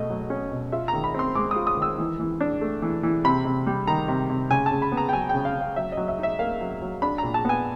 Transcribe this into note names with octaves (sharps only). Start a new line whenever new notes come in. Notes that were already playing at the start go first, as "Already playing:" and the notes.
Already playing: B2 A3 D#5
F#3
C#4
B2
F4 E5
D#3 A#5
B5
C4 C6
G#3 D6
D#6
F4
D#6
D#3 E6
E3
E3
D4
A3
E3
E3
C3 B5
C3
G3
D#3 A#5
C3
C3
C#3 G#5
A5
C#3
B5
B3
A#5
G5
F#3 G#5
G5
C#3
F5
C#3
F5
F#3 E5
F#3 D#5
E5
D#4 E5
A#3 F5
F#3
F#3
D4 B5
A#5
A#2
A5
B3 G#5